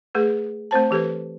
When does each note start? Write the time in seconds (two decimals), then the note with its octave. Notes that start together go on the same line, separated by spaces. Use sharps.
0.15 A3 G#4 B4
0.71 A3 C4 C5 A5
0.91 E3 G4 A4 B4